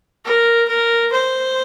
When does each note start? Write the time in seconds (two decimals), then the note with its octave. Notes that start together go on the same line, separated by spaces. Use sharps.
0.25 A#4
0.68 A#4
1.12 C5